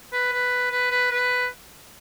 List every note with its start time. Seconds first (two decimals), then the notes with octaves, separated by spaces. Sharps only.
0.13 B4
0.32 B4
0.71 B4
0.91 B4
1.11 B4